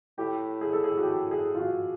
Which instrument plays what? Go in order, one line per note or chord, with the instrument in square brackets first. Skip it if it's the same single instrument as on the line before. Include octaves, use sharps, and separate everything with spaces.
[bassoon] A2 [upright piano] G4
[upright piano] G#4
A4
G#4
F#4
G4
G#4
F4
F#4